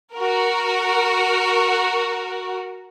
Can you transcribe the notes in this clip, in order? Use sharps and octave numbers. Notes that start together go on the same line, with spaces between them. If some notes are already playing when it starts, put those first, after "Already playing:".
F#4 A#4